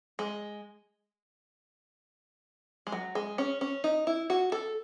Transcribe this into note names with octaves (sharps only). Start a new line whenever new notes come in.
G#3
G#3
F#3
G#3
C#4
C#4
D#4
E4
F#4
A4